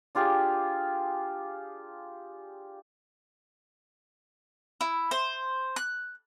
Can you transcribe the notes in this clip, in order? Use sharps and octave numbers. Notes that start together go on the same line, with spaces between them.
D4 F4 G4 G#4
E4
C5
F#6